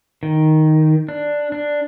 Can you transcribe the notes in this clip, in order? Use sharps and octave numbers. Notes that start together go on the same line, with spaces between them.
D#3
D4
D4